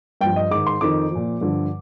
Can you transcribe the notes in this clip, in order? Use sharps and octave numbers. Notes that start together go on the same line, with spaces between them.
G2 F3 G5
D#5
G#2 D#3 D6
C6
F2 D#3 D6
A#2 F3
G2 D3 F3